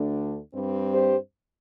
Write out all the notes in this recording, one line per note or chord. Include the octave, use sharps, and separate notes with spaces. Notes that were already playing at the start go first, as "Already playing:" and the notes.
Already playing: D2 D3 A3 D4
G2 G3 C4
G4 C5